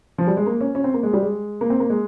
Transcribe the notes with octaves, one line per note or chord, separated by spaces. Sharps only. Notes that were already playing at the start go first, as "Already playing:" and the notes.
F3
G3
G#3
A#3
C#4
C#4
C4
A#3
G#3
G3
G#3
A#3
C4
A#3
G#3